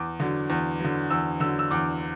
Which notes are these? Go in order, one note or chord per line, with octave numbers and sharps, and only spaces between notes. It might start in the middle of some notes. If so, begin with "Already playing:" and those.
Already playing: E2 D6
D3 F#3
E2
D3 F#3
E2 E6
D3 F#3 E6
E6
E2 D6